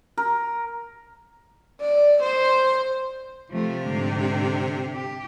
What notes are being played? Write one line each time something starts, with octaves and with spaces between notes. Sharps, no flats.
A#4
D5
C5
C3 F3 A3
G#2 D3
G4